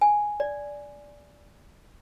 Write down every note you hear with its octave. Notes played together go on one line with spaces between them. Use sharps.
G#5
D5